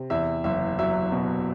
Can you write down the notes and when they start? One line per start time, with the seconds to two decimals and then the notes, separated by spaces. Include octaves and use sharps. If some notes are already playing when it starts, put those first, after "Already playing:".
Already playing: C3
0.10 E2 E5
0.44 F#1 E5
0.79 F#3 E5
1.12 B2